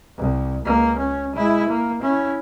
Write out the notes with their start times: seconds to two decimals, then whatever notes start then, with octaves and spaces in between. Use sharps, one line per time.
0.17 C2
0.65 C#2 A#3
0.99 C#4
1.35 G#3 E4
1.68 A#3
2.01 C#4 E4